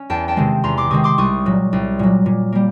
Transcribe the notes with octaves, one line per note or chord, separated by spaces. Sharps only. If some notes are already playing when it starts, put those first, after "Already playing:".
Already playing: C#4
E2 G5 A5
G5 A5
C3 D#3 G#3 C4
E2 A#5 C6
C6 D6
C3 D#3 G#3 C4 C#6 D#6
C6 D6
C2 C#6 D#6
A#2 F#3
C2
A#2 F#3
A#2
G3 A#3